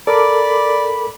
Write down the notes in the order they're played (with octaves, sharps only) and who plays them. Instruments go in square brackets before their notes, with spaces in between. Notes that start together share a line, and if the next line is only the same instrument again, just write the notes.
[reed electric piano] A4 A#4 D6 [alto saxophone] D5 [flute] B5